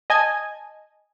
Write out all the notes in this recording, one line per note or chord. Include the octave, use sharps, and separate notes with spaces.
D#5 G#5 A5 G#6